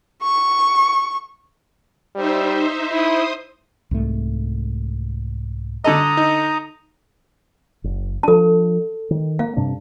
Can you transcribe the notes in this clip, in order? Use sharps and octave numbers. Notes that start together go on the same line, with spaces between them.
C#6
G3 D#4 C5 E5
E4 C5 D#6
C2 G#2 A3
D3 A4 D#5 A#5 D#6
D#4
F#1
F3 D4 A4 A5
D#3
A#3 F5
G2 C3 D4